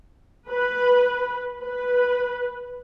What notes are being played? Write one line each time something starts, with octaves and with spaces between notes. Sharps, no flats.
B4
B4